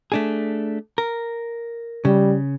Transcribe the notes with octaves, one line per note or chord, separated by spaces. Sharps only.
A3 D4 G#4
A#4
C#3 G3